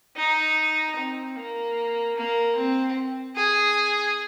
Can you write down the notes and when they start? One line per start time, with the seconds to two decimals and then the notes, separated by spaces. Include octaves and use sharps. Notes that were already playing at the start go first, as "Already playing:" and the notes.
0.16 D#4
0.97 C4
1.36 A#3
2.16 A#3
2.56 C4
3.37 G#4